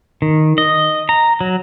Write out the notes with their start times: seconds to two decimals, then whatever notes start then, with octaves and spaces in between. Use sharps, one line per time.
0.22 D#3
0.58 D#5
1.09 A#5
1.41 F#3